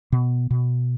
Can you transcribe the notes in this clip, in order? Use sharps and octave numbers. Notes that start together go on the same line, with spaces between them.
B2
B2